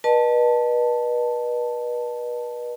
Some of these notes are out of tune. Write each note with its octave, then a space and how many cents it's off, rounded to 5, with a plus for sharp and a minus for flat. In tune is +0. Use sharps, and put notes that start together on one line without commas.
B4 -35 D#5 -40 A5 +0